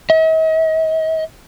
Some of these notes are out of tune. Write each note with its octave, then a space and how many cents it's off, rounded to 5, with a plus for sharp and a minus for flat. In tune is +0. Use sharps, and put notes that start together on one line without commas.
D#5 +45